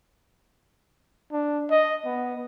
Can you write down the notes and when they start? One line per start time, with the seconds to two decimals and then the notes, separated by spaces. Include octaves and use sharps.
1.32 D4
1.70 D#5
2.05 B3